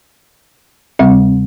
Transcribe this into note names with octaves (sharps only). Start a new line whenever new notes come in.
D2 C3 G3 C4